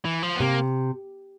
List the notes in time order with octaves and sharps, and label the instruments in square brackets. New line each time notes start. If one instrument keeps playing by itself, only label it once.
[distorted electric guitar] E3
F3
B3
[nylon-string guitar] C3 [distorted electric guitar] A#3